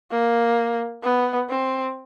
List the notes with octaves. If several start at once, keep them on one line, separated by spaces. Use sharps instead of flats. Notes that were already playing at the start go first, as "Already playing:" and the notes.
A#3
B3
C4